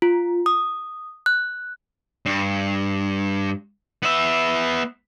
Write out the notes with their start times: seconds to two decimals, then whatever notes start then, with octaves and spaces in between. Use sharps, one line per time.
0.02 F4
0.46 D#6
1.26 F#6
2.26 G2
4.02 B3 E5